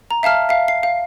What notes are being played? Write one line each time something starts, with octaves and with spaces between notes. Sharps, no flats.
A#5
E5 F5 A5 F6
E5 F5
C7
F5